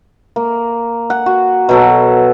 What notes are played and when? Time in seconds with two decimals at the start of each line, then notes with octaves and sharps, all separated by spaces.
0.36 A#3
1.10 F#5
1.26 F#4
1.69 B2 F#3 A4